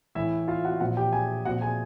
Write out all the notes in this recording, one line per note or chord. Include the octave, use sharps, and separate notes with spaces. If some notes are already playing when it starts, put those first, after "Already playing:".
A2 E3 E4 E5
F4 F5
F#4 F#5
A#2 F3 F#4 F#5
G4 G5
G#4 G#5
A#2 F3 F#4 F#5
G#4 G#5